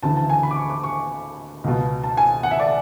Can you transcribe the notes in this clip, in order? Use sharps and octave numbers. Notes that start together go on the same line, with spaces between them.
D2 C#3 E3 A5
A5
G#5
B5
D6
C#6
D6
C#6
C#2 B2
A5
G#5
F#5
E5
D5